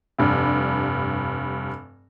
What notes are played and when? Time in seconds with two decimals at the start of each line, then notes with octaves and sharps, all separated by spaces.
0.19 F1 G2